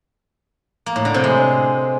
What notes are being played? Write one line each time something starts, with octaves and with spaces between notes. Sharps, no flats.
A#3
A2
D3
C3
G#3